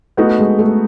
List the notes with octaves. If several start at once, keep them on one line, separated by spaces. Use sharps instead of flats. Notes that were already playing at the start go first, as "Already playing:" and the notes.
A3 B3 D#4 F#4
G#3
A3